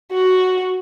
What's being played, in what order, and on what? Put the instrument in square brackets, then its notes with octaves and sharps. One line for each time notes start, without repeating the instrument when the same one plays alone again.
[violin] F#4